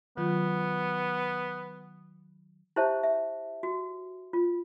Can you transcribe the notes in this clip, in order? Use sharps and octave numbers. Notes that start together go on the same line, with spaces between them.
D#3 F#3 B3 F4
E4 G4 C5 C#5 E5 A5
E5
F#4
F4